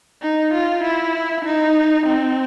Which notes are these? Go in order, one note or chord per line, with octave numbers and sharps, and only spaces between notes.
D#4
F4
E4
D#4
C4